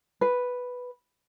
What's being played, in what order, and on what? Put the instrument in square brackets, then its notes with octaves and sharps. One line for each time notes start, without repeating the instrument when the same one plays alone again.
[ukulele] B4